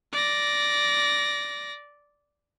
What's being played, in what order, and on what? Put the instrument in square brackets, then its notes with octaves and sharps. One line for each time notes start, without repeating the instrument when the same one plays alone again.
[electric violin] D5 A#6